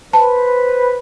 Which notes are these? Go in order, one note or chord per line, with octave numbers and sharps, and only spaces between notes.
B4 C5 A5